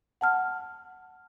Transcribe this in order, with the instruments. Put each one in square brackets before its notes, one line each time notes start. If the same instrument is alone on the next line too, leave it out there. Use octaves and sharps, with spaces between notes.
[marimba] F#5 A5 F6